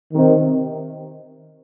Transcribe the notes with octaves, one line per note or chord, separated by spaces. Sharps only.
C3 D#3